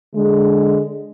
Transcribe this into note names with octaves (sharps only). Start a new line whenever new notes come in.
D3 G#3